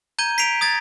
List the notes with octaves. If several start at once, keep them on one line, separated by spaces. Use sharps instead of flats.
A#5 G6 G#6 D#7 G7
B6 C7 D7 F7
D#6 G#6 A6